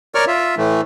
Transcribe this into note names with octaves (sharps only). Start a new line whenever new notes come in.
A#4 C#5 D5 C#6 F6
F4 E5
A2 E3 A3